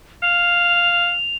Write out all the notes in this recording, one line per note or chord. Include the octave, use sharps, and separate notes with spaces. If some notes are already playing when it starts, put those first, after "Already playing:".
F5 F7